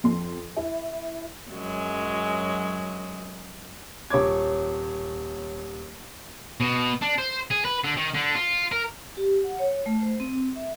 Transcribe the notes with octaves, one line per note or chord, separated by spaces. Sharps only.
F2 C6
E4 E5
F#2 F#3 G#3
D#1 C#5 D6 G#6
B2
D4
C5
G#4
B4
D3
D#3
D3
F4
A#4
G4
F#5
C#5
A3
C5
C4
E5